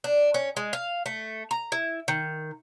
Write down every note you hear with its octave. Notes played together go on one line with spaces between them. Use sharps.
D4
C#4
G#3
F5
A3
A#5
E4
D#3